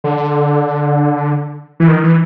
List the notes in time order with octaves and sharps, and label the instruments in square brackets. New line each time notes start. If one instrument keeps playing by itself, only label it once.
[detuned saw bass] D3
E3
D#3
E3